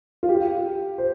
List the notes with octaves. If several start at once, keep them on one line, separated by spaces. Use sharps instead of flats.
F4
G4
C5